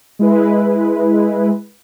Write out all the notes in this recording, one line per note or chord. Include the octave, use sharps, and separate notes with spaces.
G#3 E4 B4